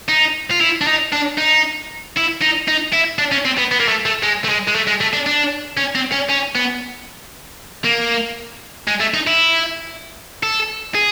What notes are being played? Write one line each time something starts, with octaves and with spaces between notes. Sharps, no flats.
D#4
F4
E4
D4
D#4
D4
D#4
E4
D#4
D#4
E4
D4
C#4
C4
B3
B3
A#3
A3
A3
G#3
A3
G#3
G#3
A3
G#3
A3
D4
D4
C#4
C4
C#4
C#4
B3
A#3
G#3
A3
D#4
E4
A4
G#4